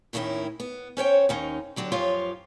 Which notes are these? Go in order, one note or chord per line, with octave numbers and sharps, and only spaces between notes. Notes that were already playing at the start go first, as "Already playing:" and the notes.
D#2 A2 D#3 C#4 E4
B3
C#4 C5 C#5 G5
D#2 C#4 D#4
D3 F#3 D4 G4
F#2 F3 F4 G4 C#5 F5